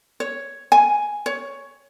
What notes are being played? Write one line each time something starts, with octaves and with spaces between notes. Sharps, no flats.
C#5
G#5
C#5